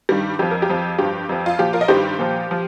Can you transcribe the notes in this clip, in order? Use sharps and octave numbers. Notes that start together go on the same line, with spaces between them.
G2 D#3 G3
F2 F3 G4
A#4
G4
F2 F3
G2 F3 G4
F2 F3
F4
A#2 F3 G4
F4 A#4
D#5
G2 D#3 G3 G4 C5
A#2 F3
F3